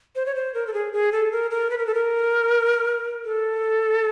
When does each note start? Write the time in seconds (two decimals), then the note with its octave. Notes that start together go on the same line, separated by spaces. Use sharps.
0.16 C5
0.26 C#5
0.35 C5
0.54 A#4
0.67 A4
0.74 G#4
0.93 G#4
1.12 A4
1.32 A#4
1.51 A#4
1.70 B4
1.78 A#4
1.87 A4
1.94 A#4
3.25 A4